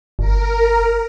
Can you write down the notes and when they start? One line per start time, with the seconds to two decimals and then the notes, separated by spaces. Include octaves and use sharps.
0.19 G1 A#4